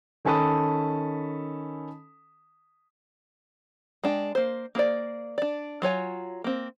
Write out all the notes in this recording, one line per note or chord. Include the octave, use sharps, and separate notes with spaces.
D#3 C#4 A4 A5 B5 D#6
G#3 D4 G5
A#3 C5
A#3 G#4 C5 D5
D4 D5
F#3 F4 C#5 G#5
A#3 C4